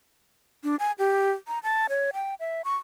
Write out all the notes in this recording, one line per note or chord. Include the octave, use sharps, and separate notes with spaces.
D4
G#5
G4
A#5
A5
C#5
G5
E5
C#6